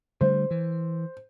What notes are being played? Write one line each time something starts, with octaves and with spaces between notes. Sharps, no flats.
D3 G3 A3 C5
E3